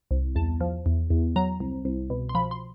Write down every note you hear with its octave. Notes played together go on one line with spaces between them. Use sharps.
C2
E2 A5
F3
E2
E2
F#3 A#5
C2
C2
B2
C6
F3 B5
C6